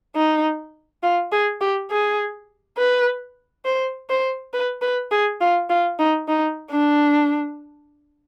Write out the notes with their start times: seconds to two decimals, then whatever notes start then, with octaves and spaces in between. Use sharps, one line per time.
0.15 D#4
1.03 F4
1.32 G#4
1.61 G4
1.90 G#4
2.77 B4
3.65 C5
4.10 C5
4.53 B4
4.82 B4
5.11 G#4
5.41 F4
5.70 F4
5.99 D#4
6.28 D#4
6.71 D4